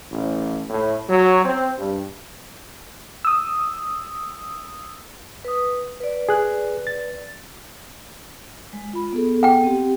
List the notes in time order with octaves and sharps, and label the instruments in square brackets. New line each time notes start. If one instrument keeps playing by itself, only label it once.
[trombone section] A1
A2
F#3
C4
G2
[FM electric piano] D#6 E6
[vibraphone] B4 D#6
B4 D5
[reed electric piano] G#4 F#6
A6
[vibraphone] G#3
F4 B5
B3 G#4 A4
[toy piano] F#5 G5
[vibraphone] C4 G4